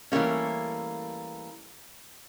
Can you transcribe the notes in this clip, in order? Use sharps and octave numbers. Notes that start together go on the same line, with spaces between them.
E3 G3 A3 A#3 C#4